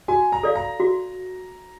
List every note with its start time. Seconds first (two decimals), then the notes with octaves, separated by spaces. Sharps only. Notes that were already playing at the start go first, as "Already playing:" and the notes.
0.08 F#4 G#5
0.32 A#5
0.43 A4 D5 F5
0.55 A#5
0.80 F#4